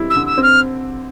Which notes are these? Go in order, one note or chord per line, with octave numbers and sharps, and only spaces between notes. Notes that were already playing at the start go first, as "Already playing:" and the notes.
Already playing: G3 C4 E4
E6
D3
E6
C4
F6